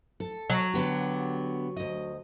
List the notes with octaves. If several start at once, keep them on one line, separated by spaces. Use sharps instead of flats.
A4
F#3
D3 B3 G4
D2 D#5